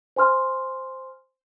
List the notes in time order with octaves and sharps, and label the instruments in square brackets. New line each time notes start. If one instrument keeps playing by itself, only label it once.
[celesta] C5 G#5 C6 F6